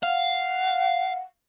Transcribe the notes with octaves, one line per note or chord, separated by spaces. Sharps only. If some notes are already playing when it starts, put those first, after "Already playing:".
F5 F#5